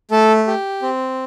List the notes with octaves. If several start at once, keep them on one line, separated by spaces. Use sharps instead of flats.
A3 A4
G4
C4